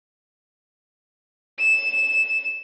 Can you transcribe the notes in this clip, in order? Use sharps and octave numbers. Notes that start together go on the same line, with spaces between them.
E7